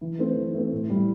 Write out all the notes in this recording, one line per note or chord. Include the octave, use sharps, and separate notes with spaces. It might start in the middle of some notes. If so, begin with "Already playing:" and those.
E3
A3 C4
E3
A3 C4
A2
G3 E4